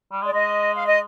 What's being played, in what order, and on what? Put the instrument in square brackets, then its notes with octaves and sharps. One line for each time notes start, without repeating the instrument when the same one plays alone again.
[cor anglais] G3
G#3
[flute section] D5
[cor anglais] G#3 [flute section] D#5
[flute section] F5
D#5